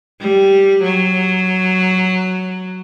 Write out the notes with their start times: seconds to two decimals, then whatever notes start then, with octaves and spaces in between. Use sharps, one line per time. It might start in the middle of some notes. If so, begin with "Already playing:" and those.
0.21 G3
0.83 F#3